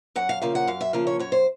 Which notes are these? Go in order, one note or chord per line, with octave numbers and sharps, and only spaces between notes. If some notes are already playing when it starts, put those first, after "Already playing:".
F#2 F#5
F5
C#3 F3 A#3 F5
F#5
F#2 F5
E5
C#3 F3 A#3 F5
C#5
F#2 C#5
C5